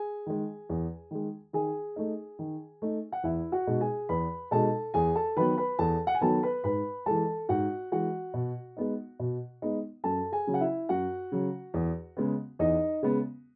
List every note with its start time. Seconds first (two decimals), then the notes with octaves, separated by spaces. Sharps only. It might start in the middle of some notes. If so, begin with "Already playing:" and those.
Already playing: G#4 G#5
0.26 D#3 G#3
0.70 E2
1.11 D#3 G#3
1.53 D#3 G#4 G#5
1.96 A3 D#4
2.39 D#3
2.82 A3 D#4
3.12 F#5
3.23 E2 E4 E5
3.52 F#4 F#5
3.67 B2 G#3 D#4
3.81 G#4 G#5
4.09 E2 B4 B5
4.51 B2 G#3 D#4 A4 A5
4.94 E2 G#4 G#5
5.16 A4 A5
5.37 D#3 F#3 B3 B4 B5
5.58 B4 B5
5.79 E2 A4 A5
6.07 F#5
6.15 G#5
6.21 D#3 F#3 B3 A4 A5
6.43 B4 B5
6.64 G#2 B4 B5
7.06 E3 G#3 A4 A5
7.49 G#2 F#4 F#5
7.92 E3 G#3 F#4 F#5
8.34 B2
8.77 G#3 B3 D#4
9.20 B2
9.62 G#3 B3 D#4
10.04 F#2 A4 A5
10.32 G#4 G#5
10.47 C#3 F#3
10.54 F#5
10.60 E4 E5
10.89 F#2 F#4 F#5
11.32 C#3 F#3
11.74 E2
12.17 C#3 G#3 B3
12.59 E2 D#4 D#5
13.03 C#3 G#3 B3